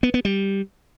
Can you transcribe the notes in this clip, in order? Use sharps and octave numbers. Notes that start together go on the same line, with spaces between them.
B3
B3
G3